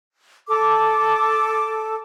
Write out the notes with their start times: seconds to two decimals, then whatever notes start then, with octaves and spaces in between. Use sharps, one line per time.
0.48 A4 D6